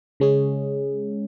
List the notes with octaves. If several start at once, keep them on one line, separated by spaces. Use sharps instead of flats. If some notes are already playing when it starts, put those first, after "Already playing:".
C#3 G#3 C#4 G#4